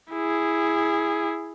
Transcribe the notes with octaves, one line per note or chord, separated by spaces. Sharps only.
E4 G#4